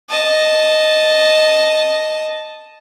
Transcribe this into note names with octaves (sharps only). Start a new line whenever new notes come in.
D#5 A5